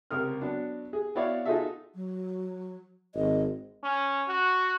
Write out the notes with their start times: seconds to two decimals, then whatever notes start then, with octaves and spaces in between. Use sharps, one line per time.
0.11 C#2 C3 A#4 D#6 F6
0.41 F#3 B3 D4
0.93 G#4
1.15 B3 E4 F#4 C#5 D5 F5
1.46 D#4 F4 F#4 G#4 A4 E5
1.95 F#3
3.15 G#1 D#5
3.83 C#4
4.28 F#4